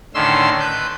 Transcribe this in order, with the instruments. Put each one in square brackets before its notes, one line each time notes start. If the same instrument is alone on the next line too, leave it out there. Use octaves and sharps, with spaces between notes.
[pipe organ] A2 D3 D#3 C#4 C6 E6
B4 G6